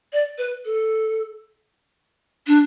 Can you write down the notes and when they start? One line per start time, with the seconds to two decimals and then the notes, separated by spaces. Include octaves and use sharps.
0.12 D5
0.38 B4
0.65 A4
2.47 D4